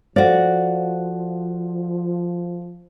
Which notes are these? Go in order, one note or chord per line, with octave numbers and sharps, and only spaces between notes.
F3 F#4 A4 C5 D5 F5